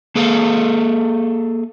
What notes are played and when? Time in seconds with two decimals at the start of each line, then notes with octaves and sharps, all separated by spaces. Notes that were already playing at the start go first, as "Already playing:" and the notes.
0.15 A#3 G#4 A4 F5